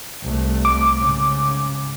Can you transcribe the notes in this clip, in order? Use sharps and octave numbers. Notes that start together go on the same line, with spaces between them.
C2 A3
D6
G#2 C#3